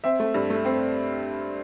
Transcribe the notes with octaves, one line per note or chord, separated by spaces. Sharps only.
C4 E5
A3
G2
A3
C4